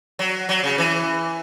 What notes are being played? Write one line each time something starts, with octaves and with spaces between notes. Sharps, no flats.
F#3
F#3
C#3
E3